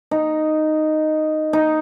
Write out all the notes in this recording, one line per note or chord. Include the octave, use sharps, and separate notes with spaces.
D#4
D#4